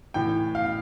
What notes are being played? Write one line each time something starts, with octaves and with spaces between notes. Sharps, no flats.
A2 E3 G5
F5